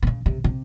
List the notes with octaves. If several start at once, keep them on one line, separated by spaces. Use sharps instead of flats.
C3
C#3
C3
C3